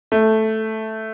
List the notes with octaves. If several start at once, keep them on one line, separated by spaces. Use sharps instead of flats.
A3